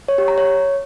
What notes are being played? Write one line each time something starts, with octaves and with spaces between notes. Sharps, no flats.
C#5
G4
A#5
C#5